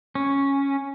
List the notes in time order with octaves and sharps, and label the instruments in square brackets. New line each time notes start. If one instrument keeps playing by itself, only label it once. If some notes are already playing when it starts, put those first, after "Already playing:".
[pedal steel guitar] C#4